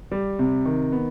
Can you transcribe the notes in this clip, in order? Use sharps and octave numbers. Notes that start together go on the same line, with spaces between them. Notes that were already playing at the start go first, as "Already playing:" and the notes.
G3
C3
D#3
B3